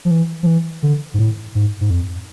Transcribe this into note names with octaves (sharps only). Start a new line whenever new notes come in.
F3
E3
F3
E3
D3
G#2
A2
G#2
G#2
F2